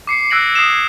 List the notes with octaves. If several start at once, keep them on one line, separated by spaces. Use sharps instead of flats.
D6 C7 C#7
E6 F#6 G#6 A#6 D7 F#7
D#6 G#6 C7 E7